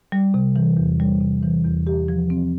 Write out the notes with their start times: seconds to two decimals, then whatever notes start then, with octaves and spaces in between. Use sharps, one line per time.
0.12 G3
0.34 C3
0.56 E3
0.77 E2
1.00 G3
1.20 C3
1.43 E3
1.64 E2
1.87 G4
2.08 F3
2.30 C4